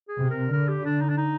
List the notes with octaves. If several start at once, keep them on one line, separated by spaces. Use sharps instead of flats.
G#4
C3
A#4
D3 A#4
G4
D4
D#4
D4
D#4